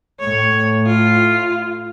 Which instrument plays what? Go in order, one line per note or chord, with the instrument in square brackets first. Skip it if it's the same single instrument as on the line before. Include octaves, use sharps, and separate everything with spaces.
[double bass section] A2 [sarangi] C#5
[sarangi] F4